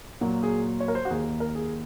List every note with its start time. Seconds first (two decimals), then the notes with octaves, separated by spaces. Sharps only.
0.21 A#2 F#3 A#3 F#4
0.43 G#4
0.80 C#5
0.88 A#4
0.95 C5
1.05 F#4
1.10 D#2 D#3 A#3 G#4
1.40 A#4
1.55 G#4